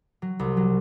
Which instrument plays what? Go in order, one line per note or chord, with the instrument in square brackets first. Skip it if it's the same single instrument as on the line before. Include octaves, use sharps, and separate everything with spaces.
[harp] F#3
C2
F#3